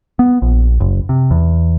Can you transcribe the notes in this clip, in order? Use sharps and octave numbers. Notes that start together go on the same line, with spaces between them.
B3
A#1
F#1
C3
E2